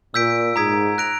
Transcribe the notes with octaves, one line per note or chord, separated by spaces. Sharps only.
A#2 E6 G6 B6 D7
G#2 A#5 D#6 G#6 B6 D7
F#6 A#6 D7 F7